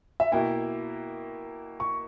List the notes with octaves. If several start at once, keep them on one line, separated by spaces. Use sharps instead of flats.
E5
B2 A#3 E4 G5
C#6